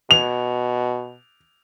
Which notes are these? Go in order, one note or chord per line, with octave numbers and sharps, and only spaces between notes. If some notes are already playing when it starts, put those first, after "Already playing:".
B2 F7